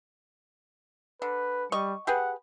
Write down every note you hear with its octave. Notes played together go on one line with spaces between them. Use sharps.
D3 B4
G3 D#5 C#6
G4 G#4 B4 F#5